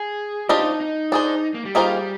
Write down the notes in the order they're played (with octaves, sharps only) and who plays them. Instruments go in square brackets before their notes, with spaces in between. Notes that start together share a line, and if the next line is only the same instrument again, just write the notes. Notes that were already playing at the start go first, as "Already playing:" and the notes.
Already playing: [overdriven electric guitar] G#4
[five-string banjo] D4 F4 C5 D#5 [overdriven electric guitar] G4
[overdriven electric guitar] D#4
D#4
D#4
[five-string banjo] D4 G#4 C5
[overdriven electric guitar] A#3
G3
[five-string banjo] D#3 A#3 F4 G#4 C5